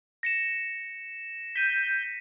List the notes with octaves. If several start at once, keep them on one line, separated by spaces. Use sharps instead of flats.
A#6 C#7 E7
G6 B6 D#7